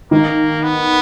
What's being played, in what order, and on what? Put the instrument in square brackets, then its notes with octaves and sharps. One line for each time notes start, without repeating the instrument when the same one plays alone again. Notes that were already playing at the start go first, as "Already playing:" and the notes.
[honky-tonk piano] D#3 [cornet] A#3
[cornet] B3